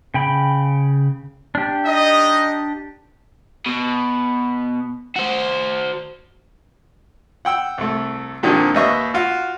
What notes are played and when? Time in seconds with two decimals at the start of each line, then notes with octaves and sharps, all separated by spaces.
0.14 C#3 G5 B5
1.55 D4 G4
1.86 D#4 D#5
3.66 B2
5.16 F#4 C5
7.45 F#5 G5 E6
7.78 C2 A3
8.43 A#2 D3 D#3 F3 C4
8.74 D#2 B4 D#5 E5 C#6
9.14 F4 F#4